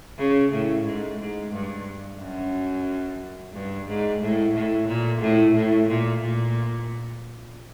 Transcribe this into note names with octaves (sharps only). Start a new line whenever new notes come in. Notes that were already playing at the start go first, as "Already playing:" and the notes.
C#3
A2
G#2
G#2
G2
F#2
G2
G#2
A2
A2
A#2
A2
A2
A#2
A#2